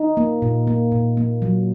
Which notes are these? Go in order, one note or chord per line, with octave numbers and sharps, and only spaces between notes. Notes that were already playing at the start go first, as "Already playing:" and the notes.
Already playing: D#4
A#3
A#2
A#3
A#2
A#3
F#3